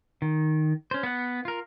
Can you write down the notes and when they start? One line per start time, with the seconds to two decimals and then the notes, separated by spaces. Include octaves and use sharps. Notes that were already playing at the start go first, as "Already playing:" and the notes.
0.22 D#3
0.91 C#4 C5
1.03 B3 F#5
1.45 F4 A#4